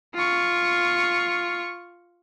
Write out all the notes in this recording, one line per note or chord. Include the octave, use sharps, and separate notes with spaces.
F4 C#6